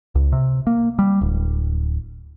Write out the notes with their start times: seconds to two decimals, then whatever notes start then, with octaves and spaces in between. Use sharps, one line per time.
0.15 C#2
0.32 C3
0.67 A#3
0.99 G3
1.21 D1